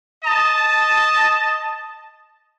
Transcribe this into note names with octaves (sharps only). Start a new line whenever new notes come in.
D#5 A5